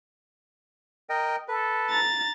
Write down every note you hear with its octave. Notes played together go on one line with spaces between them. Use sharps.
A#4 D#5 G5
A4 B4
A#5 A6